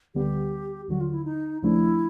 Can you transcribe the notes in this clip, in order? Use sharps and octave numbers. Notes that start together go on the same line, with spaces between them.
D2 D3 G3 B3 G4
D#2 D3 F#3 F#4
F4
E4
D#4
D#2 C#3 F3 A3 D4 E4